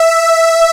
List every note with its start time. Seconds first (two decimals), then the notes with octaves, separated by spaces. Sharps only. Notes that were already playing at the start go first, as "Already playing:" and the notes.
Already playing: E5